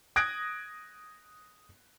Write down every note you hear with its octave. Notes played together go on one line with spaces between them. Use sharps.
D#6 F#6 G#6 A#6 D7